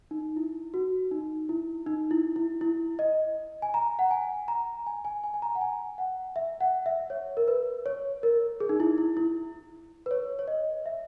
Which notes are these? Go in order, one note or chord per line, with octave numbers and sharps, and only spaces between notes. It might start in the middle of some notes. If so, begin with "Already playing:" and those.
D#4
E4
F#4
D#4
E4
D#4
E4
E4
E4
D#5
G#5
A#5
F#5
G#5
A#5
G#5
G#5
G#5
G#5
A#5
F#5
G#5
F#5
E5
F#5
E5
C#5
A#4
B4
C#5
A#4
G#4
D#4
E4
E4
E4
B4
C#5
C#5
D#5
E5